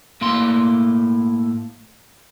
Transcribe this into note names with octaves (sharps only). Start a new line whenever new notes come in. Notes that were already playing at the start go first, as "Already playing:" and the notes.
A2 A#3 E4 C6